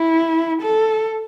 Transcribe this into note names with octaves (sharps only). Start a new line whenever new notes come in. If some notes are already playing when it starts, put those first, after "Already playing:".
Already playing: E4
A4